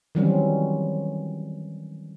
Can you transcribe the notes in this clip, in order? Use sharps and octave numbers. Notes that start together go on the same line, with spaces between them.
D#3 E3 F#3 G3 C4 C#4